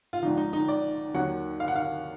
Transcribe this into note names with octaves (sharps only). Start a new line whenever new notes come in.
F4
A#1 G#2 F3 D#4
D#4
D#4
D5
D#2 D#3 F#3 F#5
F5
F#5
F5